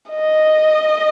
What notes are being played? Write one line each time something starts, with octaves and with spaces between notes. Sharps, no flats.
D#5